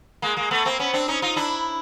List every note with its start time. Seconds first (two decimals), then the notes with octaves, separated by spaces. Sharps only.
0.22 G#3 A#3
0.37 G#3 A#3
0.51 A3 B3
0.65 A#3 C4
0.79 B3 C#4
0.93 C4 D4
1.08 C#4 D#4
1.22 D#4 F4
1.36 D4 E4